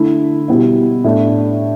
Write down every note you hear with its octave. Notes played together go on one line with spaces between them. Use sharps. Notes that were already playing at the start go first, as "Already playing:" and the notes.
Already playing: D3 A3 E4
B2 G3 B3 E4
A2 A3 D4